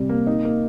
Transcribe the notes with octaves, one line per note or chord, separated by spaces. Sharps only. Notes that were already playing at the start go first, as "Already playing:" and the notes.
Already playing: C3 G3
A#3
D#4
A#3